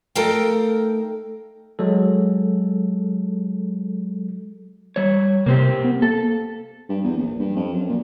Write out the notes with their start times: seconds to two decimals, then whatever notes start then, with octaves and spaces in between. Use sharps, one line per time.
0.15 A3 D#4 A4 A#4 F5 G5
1.79 F#3 G#3 A4
4.96 G3 C#5
5.46 C3 A#3 C4 G4
5.84 B3
6.02 A#3 A4
6.89 G2
7.04 E2
7.17 A#1
7.39 G2
7.56 F2
7.73 F#2
7.89 A#2